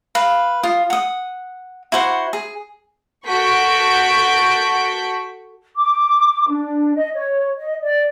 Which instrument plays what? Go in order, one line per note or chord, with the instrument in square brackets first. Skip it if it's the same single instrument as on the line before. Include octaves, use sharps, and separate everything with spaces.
[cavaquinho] B4 F5
F4 D#6
F#5 D#6
E4 F#4 C5 F#5
G#4
[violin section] F#4 A4 C#6 G6 B6 D7
[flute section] D6
D4
D#5
C#5
D#5
D5